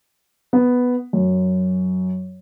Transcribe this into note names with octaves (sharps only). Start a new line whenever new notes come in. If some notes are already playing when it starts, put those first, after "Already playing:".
B3
F#2